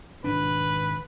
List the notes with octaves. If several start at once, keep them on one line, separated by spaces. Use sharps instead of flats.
G#1 B2 D4 B4